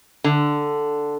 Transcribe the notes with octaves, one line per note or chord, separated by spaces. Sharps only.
D3